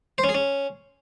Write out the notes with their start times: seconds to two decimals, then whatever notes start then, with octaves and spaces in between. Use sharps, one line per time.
0.18 C5
0.24 C#4
0.29 G#4
0.34 C#4